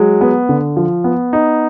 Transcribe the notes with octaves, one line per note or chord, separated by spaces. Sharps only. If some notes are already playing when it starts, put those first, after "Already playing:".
Already playing: F#3 G#3
B3
D3
F3
B3
D#4